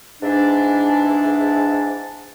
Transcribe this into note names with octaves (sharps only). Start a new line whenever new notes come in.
G#2 E3 D4